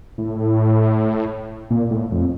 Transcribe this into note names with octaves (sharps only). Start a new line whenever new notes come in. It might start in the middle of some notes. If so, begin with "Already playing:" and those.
A2
A#2
A2
F2